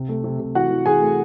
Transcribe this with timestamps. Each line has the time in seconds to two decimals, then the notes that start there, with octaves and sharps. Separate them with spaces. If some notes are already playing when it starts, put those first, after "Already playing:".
Already playing: C3
0.09 A3
0.24 C3
0.40 C3
0.55 E3 F#4 F#5
0.71 E3
0.86 E3 G#4 G#5
1.01 A3